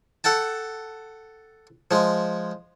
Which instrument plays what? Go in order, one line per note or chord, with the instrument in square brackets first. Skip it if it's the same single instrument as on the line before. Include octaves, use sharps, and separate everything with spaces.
[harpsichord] A4 F#5 G5 A5
F3 G#3